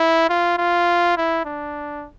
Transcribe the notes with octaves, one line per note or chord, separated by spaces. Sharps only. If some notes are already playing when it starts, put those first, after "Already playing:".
Already playing: E4
F4
F4
E4
D4